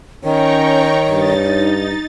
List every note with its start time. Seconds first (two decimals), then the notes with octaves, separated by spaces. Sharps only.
0.24 D#3 C#4 C#5 G5 A#5 C#6
1.10 G2 D#4 A6